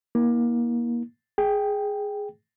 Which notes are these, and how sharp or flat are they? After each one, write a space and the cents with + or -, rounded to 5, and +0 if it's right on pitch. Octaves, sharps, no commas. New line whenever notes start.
A#3 +25 E4 -45
G#4 +0 G5 +0